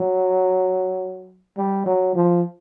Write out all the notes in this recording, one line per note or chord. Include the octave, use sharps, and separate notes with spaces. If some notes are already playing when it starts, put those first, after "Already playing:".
Already playing: F#3
G3
F#3
F3